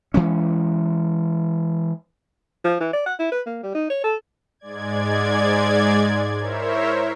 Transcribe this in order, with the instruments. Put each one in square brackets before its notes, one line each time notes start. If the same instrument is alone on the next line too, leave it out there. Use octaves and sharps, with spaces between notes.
[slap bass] E3 G#3 C#4
[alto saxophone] F3
E3
D5
F#5
E4
B4
A#3
G3
D#4
C#5
A4
[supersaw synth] G#2 G#3 D5 G#6
E4 A#4 C5 C#5 E5